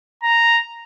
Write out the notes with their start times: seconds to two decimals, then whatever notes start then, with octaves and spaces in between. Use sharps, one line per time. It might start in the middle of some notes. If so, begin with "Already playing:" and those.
0.23 A#5